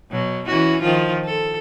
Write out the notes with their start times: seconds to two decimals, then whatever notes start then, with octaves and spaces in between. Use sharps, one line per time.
0.11 B2 F#3
0.47 E3 C#4 F#4
0.82 D#3 F3 F4
1.25 A4